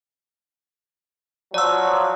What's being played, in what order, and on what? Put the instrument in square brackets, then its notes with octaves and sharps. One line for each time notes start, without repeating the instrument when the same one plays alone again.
[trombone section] F3 F#3 [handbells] D5 E6